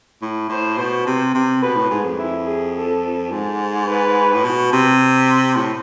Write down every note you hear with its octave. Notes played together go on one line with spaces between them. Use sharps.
A2
A2 C5
B2
C3
C3
B2 B4
A2
G#2 G#4
F2
E4
G#4
A4
G#2
B4
A2
B2
C3
A2